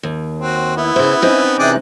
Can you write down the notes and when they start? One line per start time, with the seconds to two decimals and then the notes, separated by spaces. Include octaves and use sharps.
0.03 D#2
0.39 C4 F#4
0.77 B3 E4
0.96 C#3 C5
1.22 C4 C#4 D#4
1.59 C3 E3 G#4 D5 G5 F#6